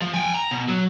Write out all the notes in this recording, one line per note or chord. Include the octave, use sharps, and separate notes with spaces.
F3
G5 G#5
A#5
B2
F#3